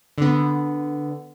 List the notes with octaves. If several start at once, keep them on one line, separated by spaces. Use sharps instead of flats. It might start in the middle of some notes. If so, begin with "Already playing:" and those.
D3 B3